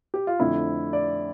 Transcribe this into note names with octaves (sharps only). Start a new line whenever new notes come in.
G4
F4
F2 D3 A3 C4 E4
D5